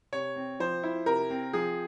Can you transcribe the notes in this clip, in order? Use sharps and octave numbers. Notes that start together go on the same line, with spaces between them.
C3 C#5
C4
F3 C5
E4
C3 A#4
C4
F3 G#4